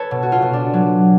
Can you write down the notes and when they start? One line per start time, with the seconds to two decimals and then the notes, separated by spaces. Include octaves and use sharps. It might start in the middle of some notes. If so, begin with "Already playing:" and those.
Already playing: A4 B4 C#5
0.11 B2
0.23 F#4
0.32 F4
0.42 B2
0.53 D4
0.74 F#3